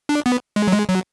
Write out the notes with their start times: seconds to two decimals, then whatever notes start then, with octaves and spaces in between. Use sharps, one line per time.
0.09 D4
0.26 B3
0.56 G#3
0.67 F#3
0.73 G#3
0.89 F#3